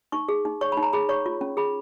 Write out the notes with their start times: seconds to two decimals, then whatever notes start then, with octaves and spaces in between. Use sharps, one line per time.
0.12 D#4 C#6
0.29 G#4
0.45 D#4
0.61 C#5 C#6
0.72 D#4 B5
0.83 A#5
0.93 G#4 B5
1.09 C#5 C#6
1.26 F4
1.41 C#4
1.57 G#4 B5